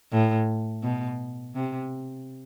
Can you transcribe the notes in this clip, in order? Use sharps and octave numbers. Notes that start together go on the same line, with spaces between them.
A2
B2
C3